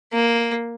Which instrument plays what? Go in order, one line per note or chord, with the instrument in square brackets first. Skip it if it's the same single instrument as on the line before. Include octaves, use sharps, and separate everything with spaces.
[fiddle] A#3